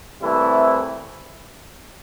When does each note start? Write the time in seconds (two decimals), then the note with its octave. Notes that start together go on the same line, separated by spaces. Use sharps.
0.21 C2 C3 E3 A3 E4